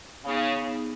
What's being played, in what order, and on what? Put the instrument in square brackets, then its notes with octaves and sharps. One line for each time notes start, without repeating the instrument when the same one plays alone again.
[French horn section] C#3 [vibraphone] B3 D#4 G#4